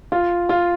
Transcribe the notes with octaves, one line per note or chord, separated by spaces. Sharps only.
F4
F4